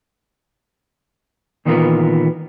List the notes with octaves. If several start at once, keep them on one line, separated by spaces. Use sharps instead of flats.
A#2 D#3 E3 B3 F4 A#4